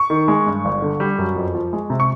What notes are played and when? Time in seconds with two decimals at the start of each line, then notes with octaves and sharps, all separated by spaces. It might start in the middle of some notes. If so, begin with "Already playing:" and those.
Already playing: C#6
0.10 D#3
0.28 G#3
0.47 G2
0.65 G1
0.82 D3
1.00 G3
1.18 F#2
1.36 F2
1.55 F3
1.73 G#3
1.90 C3
2.00 C#6